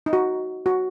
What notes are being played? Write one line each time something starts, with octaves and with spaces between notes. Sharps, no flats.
D#4
F#4
F#4